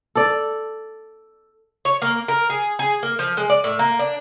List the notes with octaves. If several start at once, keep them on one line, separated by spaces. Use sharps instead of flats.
A4 D5
C#5
A#3
A#4
G#4
G#4
A#3
F3
G#3
D5
A2
A#3
D4